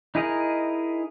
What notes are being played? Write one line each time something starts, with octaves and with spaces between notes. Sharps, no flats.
D#4 E4 G#4 A#4 D#5